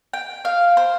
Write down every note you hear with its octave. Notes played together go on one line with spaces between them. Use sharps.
G5
F5
C5